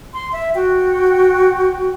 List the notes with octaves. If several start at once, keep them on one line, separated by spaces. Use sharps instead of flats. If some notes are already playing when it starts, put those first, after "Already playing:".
C6
E5
F#4 G5